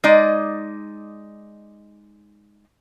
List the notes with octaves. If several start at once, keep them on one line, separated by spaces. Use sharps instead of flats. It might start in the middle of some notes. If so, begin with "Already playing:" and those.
G#3 D#4 D5